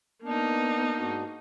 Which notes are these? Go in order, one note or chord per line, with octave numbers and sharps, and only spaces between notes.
A#3 B3 D4 D#4
G#2 D4 F#4